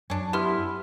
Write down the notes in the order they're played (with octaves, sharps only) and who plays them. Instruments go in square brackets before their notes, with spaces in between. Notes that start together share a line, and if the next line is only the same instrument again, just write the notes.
[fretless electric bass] F#2 [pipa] C#4 D4
[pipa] B3 [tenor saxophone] E4 [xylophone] G4 C6 F6